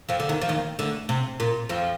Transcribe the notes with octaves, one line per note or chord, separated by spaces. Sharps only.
F2 F3
D3
D#2 D#3
F3
D#2 D#3
D2 D3
C3
A#2
F2 F3